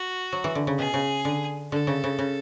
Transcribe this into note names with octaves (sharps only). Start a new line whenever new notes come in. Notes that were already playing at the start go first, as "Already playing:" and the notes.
Already playing: F#4
F#3
E3
D3
C#3
B2 G#4
C#3
D3
D3 A4
C#3
C#3
C#3